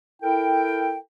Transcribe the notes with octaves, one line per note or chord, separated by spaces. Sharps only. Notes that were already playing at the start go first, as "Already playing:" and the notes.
E4 A4 A#4 G5